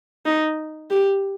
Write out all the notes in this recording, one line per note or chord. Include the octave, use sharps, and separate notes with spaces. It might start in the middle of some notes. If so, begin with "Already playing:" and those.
D#4
G4